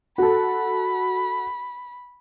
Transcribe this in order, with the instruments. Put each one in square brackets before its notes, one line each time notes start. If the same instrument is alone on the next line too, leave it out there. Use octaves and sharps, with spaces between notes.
[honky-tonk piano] F#4 A4 [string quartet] B5